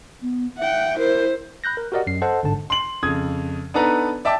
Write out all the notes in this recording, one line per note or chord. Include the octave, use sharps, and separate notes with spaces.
B3
E5 F#5 G5
E4 A#4 C5
B5 F#6 G6 A#6
A#4
F#4 G4 A#4 D5 D#5 F#5
F#2 C7
A4 C5 D#5 F#5 A5
G1 G#2 D3 A5
C6 F#7
F2 C#3 D#6 G#6
B3 D4 D#4 A4 B4 A#5
D5 E5 G5 A5 D6